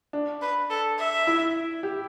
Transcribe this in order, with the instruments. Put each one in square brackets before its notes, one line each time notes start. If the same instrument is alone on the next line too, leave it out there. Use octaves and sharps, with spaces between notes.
[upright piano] D4
[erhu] B4
A4
E5
[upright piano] E4
G4